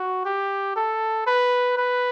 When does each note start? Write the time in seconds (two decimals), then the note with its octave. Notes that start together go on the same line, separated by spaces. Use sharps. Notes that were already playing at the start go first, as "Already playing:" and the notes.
Already playing: F#4
0.25 G4
0.76 A4
1.27 B4
1.78 B4